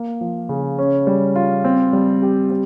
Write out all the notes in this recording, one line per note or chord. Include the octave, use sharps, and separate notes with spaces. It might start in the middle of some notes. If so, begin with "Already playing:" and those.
Already playing: A#3
F3
C#3
C#4
G3
F4
C4
G3
G4
C4